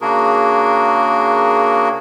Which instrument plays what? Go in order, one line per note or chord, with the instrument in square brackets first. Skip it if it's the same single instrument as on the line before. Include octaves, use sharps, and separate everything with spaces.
[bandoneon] C#3 A#3 D4 F#4 G#4 A#4